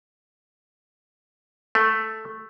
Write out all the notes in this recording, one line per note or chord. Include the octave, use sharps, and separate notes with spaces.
A3